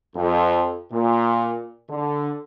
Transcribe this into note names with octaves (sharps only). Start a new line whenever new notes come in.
F2
A#2
D3